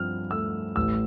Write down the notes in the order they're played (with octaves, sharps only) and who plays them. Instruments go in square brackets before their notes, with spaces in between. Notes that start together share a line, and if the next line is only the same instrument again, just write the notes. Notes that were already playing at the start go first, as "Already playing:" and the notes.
Already playing: [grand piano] G2 F3 C4 F6
A3 E6
A1 E6